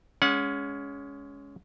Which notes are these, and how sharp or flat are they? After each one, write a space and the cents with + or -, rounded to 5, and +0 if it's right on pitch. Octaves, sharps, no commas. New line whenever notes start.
G#3 +0 C#4 +15 F#5 -30